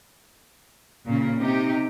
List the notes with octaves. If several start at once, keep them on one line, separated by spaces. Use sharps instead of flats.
A#2 C#3 A#3
C3 D#4 G4